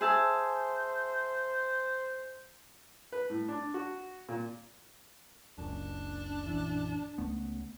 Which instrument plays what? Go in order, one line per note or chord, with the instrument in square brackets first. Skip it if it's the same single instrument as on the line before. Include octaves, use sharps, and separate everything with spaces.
[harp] G#4 E5 A5 [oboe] C5
[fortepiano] B4
A2
D4
F#4
A#2
[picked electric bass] F#1 C#2 F#2 [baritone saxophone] D4
[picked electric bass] A#1 F#2 E3
C#2 A3 B3